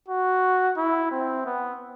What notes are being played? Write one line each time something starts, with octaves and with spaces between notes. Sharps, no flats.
F#4
E4
C4
B3